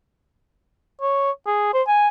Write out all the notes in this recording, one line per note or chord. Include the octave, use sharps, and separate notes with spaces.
C#5
G#4
C5
G#5